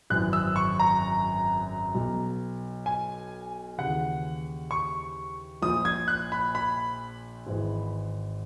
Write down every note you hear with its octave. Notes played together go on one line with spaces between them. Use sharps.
G#1 F#2 E3 F#6
E6
C#6
A#5
B1 B2
G#5
D#2 C#3 E3 F#5
C#6
A#1 A#2 D#6
G#6
F#6
B5
B5
G#1 G#2 E3